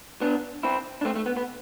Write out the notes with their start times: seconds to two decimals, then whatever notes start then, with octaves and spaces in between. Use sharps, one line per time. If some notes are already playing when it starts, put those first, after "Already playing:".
0.21 B3 D4
0.63 C4 E4
1.01 D4
1.05 A3 C4
1.16 A3
1.26 B3
1.37 B3